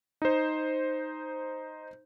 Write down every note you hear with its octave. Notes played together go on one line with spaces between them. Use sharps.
D#4 C5